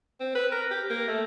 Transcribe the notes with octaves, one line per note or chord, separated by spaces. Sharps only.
C4
B4
A#4
G4
A#3
A3